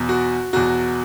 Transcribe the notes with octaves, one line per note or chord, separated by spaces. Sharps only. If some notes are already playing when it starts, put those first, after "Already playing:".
Already playing: E2 B2 F#3
F#4
E2 B2 F#3 F#4